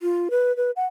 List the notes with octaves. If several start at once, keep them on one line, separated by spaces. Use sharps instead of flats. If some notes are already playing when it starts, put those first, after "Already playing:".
F4
B4
B4
F#5